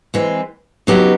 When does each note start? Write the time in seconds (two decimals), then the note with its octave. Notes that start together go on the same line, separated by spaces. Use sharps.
0.14 E3 G#3 C4
0.87 C#3 F#3 B3 D#4 G4